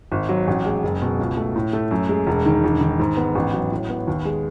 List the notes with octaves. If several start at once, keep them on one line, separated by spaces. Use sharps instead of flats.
G#1
F#3
A1
G#3
F#1
B2
C#2
A3
A2
A3
F#2
G#3
E1
D#3
E1
D#3
G#2
B3
A1
F#3
A2
B3
D#2
G#3